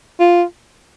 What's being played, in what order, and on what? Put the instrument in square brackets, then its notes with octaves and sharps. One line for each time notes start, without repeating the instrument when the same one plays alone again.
[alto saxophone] F4